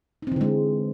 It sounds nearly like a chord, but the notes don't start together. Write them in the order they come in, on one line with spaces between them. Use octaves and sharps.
D#4 C4 E3 D3 G#3